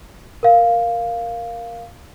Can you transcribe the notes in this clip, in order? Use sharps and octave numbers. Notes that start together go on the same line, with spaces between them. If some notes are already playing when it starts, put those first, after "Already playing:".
A#4 F5